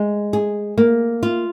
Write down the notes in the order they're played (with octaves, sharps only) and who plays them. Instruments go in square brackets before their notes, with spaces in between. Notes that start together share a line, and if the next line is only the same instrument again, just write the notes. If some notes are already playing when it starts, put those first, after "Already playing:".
Already playing: [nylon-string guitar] G#3
G#4
A#3
F4